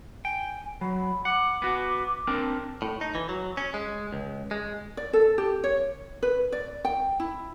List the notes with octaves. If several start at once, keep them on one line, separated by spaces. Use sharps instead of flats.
G5 G#5
F#3 B5
F#5 D6
B3 F#4
C4 D4 A#4
A2
D#4
E3
F#3
C#4
G#3
C#2
G#3
D5
A4
G4
C#5
B4
D5
G5
E4